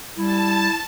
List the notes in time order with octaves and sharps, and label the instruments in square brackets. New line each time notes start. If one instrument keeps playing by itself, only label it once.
[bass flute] G3 [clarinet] E4 [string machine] A5